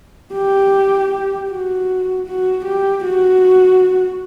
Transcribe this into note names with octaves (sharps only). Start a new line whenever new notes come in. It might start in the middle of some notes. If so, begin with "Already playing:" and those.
G4
F#4
F#4
G4
F#4